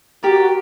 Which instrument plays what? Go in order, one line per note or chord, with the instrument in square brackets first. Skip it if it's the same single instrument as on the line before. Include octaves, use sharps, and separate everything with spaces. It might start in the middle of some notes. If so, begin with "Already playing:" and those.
[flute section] F#4 [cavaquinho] G4 A#4 D5